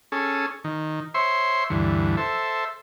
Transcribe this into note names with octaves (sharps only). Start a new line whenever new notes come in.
C#4 G#4 A4
D#3
C5 C#5 E5 C6
D2 G2 E3
A4 C5 E5